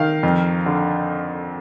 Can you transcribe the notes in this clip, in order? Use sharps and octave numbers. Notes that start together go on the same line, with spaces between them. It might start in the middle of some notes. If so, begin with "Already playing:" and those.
Already playing: D#3 F5
F2
D3